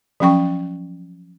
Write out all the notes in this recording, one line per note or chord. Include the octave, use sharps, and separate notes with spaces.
F3 F#3 C#4 G5 C#6